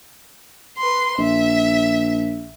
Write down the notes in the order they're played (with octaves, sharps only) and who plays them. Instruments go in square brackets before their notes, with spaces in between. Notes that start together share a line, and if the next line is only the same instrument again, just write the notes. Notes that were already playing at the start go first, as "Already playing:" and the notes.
[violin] B4 C6
[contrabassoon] A#1 [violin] E5